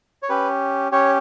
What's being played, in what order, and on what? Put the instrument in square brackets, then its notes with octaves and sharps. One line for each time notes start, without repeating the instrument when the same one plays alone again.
[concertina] C#5
C#4 G4 B4
C#4 G4 C#5